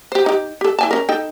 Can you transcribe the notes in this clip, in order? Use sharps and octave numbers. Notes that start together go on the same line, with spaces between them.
G4 C5
D#4 G4
G4 A4
E4 G#5 A5
C#4 A#4
D#4 A4 G5